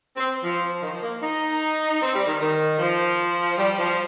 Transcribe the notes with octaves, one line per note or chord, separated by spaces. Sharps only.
C4
F3
D#3
F3
A#3
D#4
C4
G3
D#3
D#3
F3
G3
F3